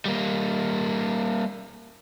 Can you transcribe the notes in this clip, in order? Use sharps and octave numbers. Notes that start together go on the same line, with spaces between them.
G3 A#3